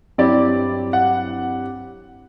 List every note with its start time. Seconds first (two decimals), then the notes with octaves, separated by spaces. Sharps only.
0.18 G2 F#3 C4 E4 G4 D5
0.93 F#5